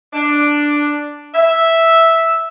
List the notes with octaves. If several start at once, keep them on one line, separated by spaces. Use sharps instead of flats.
D4
E5